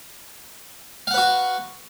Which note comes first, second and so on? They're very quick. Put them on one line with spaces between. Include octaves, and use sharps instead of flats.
F5 F#5 B4 F#4